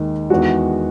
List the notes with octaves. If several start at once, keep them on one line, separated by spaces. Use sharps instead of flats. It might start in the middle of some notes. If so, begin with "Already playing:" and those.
Already playing: D#2 D#3 G#3
E2 D#3 G#3 F#4